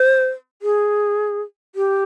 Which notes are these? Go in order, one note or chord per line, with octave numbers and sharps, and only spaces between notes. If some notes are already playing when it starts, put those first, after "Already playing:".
Already playing: C5
G#4
G4